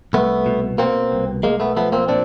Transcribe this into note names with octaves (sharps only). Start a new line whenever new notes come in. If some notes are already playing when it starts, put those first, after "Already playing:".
C2 A3 B3
B2
B2 A#3 C4
C2
B1 G#3 A#3
A3 B3
F3 A3 B3
A#3 C4
A#2 C4 D4